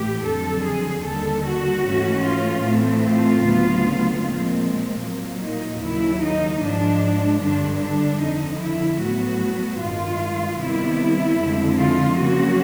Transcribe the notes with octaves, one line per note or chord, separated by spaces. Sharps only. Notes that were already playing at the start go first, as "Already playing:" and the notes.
Already playing: A2 E3 G4
F2 D3 F#3 A4
G#4
D#2 D3 G3 A4
F#4
G#2 E3 A3 C#4
F4
A2 E3 A3 C4
F4
D2 C#3 F#3 B3
A#2 F3 G#3 C4
A#2 F#3 A#3
D#4
D#2 C#3 F#3 E4
D#4
G#2 F3 G#3 D4
G2 D3 G3 D4
D4
F2 D3 F3 D#4
E4
A2 F#3 B3 F#4
G2 D#3 G#3 F4
C3 D#3 G3 B3 E4
F2 D3 F3 G#3
F4
C#3 F#3 A#3 C#4 F#4